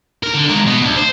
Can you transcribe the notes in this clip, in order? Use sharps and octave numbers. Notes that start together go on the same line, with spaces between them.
A#4
D3
G#3 A#4
B2
D2
C5